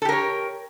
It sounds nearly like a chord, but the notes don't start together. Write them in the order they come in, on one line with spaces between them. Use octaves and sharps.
A4 G4 A#4 C#5